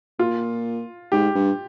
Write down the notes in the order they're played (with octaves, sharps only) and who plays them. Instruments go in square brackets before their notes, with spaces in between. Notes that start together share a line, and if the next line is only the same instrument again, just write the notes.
[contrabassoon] A#2 [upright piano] F4
[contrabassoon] G#2 [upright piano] G4
[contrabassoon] G2